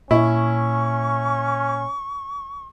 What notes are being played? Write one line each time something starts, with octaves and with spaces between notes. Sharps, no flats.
A#2 C#4 E4 C#6